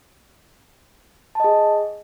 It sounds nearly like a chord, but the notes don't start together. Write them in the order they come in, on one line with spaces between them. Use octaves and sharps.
A5 D#5 G#4